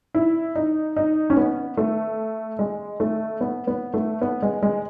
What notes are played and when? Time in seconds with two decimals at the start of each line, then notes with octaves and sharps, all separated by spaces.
0.15 E4
0.56 D#4
0.97 D#4
1.30 C#4
1.37 B3
1.77 A3
2.59 G#3
3.00 A3
3.41 B3
3.67 B3
3.94 A3
4.21 B3
4.42 G#3
4.63 G#3